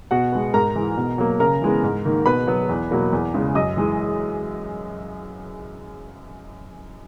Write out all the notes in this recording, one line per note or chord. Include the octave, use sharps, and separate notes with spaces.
B2 F#4 F#5
G#3 B3
G#2 A#4 A#5
E3 G#3
B2
F#3 A#3
C#3 A#4 A#5
E3 G#3 B3
G#2
D#3 A#3
B2 B4 B5
F#3 B3
E2
B2 F#3 A#3
E2
C#3 E3 G#3
F#2 D#5 D#6
E3 G#3